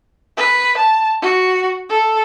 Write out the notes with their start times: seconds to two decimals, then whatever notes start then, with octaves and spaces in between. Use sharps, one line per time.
0.38 B4
0.77 A5
1.22 F#4
1.90 A4